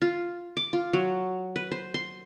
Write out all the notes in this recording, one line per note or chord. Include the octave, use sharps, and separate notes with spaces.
F4
D6
F4
F#3
B4
C5
C6